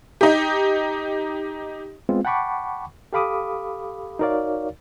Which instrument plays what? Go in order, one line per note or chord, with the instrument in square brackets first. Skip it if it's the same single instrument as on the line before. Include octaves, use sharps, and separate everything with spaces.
[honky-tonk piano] D#4 G4
[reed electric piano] G#3 B3 C4 F4
F#5 G5 A5 B5 C#6 D6
G4 A4 F5 B5 D6 D#6
D#4 F#4 A#4 C#5 D5 F5